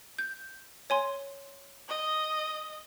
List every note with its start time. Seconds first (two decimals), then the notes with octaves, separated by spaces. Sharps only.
0.18 G6
0.90 C#5 G#5 C6
1.88 D#5